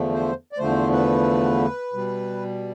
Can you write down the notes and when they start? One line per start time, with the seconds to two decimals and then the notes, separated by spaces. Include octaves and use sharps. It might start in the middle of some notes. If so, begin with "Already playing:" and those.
Already playing: E2 D3 F3 A3
0.14 C5
0.52 D5
0.58 E2 D3 F3 A3 C5
0.92 B4
1.93 B2 G3